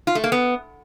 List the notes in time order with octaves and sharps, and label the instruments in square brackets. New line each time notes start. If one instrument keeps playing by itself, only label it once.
[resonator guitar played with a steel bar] F4
A3
A#3
B3